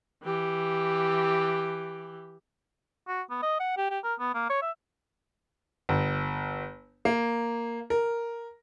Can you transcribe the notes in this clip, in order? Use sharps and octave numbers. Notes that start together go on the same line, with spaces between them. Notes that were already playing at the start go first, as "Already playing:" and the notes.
E3 G4
F#4
B3
D#5
F#5
G4
G4
A#4
B3
A#3
C#5
E5
G1
A#3
A#4